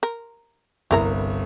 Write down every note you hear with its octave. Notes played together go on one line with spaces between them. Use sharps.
A#4
G1 C2 E4 A#4 A#5